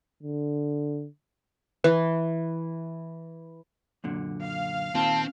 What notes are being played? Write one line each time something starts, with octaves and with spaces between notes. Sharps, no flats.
D3
E3 B4
F#2 A#2 D3
F5
A#2 D#3 C4 F4 A5